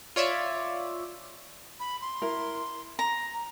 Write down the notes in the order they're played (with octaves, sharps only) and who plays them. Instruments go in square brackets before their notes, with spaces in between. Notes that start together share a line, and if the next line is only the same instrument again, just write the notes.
[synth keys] F4 C#5 D5 E5
[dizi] B5
C6
[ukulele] E4 A#4
[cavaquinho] A#5